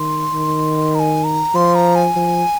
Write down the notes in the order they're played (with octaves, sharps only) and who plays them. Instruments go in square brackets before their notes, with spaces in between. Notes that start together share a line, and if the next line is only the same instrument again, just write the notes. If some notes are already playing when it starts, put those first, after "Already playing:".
Already playing: [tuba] D#3 [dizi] C6
[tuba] D#3
[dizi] A#5
G#5
A#5
[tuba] F3 [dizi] C6
[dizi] A#5
G#5
[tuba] F3